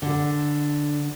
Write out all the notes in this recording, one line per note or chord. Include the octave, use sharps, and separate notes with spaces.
D3